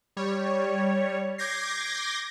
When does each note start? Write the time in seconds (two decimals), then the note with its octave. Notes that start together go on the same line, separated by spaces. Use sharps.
0.17 G3 C#5
1.38 D6 G6 G#6 A#6 C7